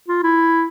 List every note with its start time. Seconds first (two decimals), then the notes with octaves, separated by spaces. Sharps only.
0.09 F4
0.23 E4